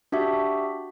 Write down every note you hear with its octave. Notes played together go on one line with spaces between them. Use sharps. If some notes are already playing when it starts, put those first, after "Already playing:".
D4 F#4 G4 E5